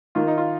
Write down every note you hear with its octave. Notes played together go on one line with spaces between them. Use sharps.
D#3 A#3 F4
D#4
F4